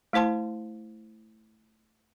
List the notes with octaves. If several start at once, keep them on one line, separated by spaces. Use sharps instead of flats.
A3 E4 C5 A5 C6